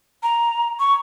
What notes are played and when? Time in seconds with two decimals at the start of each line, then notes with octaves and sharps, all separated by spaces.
0.23 A#5
0.80 C#6